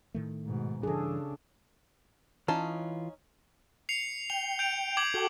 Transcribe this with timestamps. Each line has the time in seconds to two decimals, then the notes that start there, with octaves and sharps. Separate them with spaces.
0.14 A2 D#3 A3
0.45 G#2 B2
0.83 G2 C#3 E3 D4 G#4 A4
2.48 E3 C#4 D#4 F4 A5
3.89 C7 C#7 F7
4.30 G5 F7
4.59 G6 D7 F7
4.97 D6 G#6 F#7
5.14 F#4 A4 G5